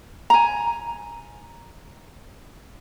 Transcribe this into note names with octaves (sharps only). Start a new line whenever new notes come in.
G#5 A#5